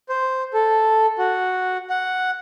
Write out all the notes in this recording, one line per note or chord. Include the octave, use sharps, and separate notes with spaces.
C5
A4
F#4
F#5